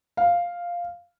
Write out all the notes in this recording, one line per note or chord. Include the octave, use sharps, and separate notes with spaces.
F5